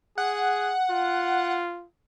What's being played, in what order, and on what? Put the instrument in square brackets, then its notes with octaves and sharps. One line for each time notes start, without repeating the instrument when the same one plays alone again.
[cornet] G#4 [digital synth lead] F#5
[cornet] F4